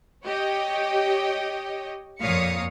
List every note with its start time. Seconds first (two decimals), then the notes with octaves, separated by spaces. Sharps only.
0.24 G4 C#5 D#5 G5
2.21 F2 A#2 C#5 F5 D#6 C#7